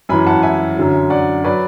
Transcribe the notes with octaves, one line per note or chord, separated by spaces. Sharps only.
F#2 E3 G#5 B5
F#5 A5
E5 G#5
F#2 D3 F#3
D5 F#5
F#3 B4 D5